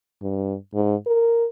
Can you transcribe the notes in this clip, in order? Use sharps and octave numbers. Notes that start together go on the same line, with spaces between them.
G2
G#2
A#4